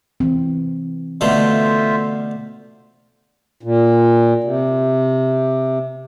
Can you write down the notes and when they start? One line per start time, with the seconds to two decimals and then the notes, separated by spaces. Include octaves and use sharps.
0.20 E3 C4
1.21 B2 D3 A3 F4 C5 E5
3.63 A#2
4.44 C3